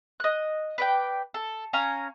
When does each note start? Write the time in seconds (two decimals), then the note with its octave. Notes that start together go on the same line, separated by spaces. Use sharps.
0.20 D#5 F#6
0.78 B4 D5 G5
1.34 A4
1.73 C#4 F5 G#5 A#5